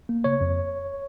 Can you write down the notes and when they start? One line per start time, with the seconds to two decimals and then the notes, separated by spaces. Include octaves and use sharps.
0.09 A#3
0.24 C#3 C#5
0.41 F2